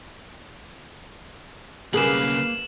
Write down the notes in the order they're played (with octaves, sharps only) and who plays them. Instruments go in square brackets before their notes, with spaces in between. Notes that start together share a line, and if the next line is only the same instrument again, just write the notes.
[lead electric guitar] B1 C#3 [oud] A#3 G#4 [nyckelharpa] B4 F5 [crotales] E7 F#7